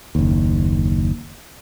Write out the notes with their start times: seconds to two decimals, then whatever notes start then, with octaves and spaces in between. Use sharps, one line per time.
0.15 F#1 D#2